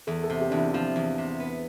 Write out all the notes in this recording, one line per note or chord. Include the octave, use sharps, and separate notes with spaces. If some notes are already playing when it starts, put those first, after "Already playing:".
E2 A4
A4
C3
G4
E2 D4
E4
F3 E4
E2
C3
B3